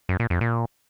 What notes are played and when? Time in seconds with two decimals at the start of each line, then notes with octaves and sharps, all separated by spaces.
0.09 F#2
0.20 A#2
0.30 F2
0.41 A#2